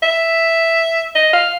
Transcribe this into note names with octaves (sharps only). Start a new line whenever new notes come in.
E5
D#5
F5